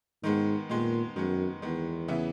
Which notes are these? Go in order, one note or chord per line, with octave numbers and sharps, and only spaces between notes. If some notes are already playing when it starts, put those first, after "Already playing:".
G#2 D#3 G#3 B3
A#2 D#3 G#3 B3
F#2 D#3 G#3 B3
E2 D#3 G#3 B3
C#3 E3 B3 E4